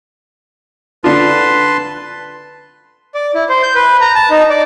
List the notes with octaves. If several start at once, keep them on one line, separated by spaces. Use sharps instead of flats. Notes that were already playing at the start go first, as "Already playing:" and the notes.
D3 D4 F4 B4 A5 C6
D5
E4
C5
G6
B4
A#5
A5
D#4
D5